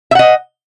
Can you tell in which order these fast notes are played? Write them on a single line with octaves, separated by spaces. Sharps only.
E5 F#5 D#5